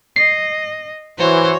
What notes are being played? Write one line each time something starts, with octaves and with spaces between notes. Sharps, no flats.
D#5 C7
E3 F#4 C5 C#5